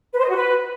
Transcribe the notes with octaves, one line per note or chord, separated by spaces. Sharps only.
B4
C5
D#5
F#4
B4